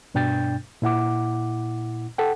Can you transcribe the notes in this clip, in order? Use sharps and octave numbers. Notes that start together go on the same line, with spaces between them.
G2 B2 D4 G5 G6 A6
A#2 E4 F#5 D6
A4 F#5 G5